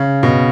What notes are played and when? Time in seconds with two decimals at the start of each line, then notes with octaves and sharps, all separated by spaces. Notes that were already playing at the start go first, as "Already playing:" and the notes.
Already playing: C#3
0.23 B2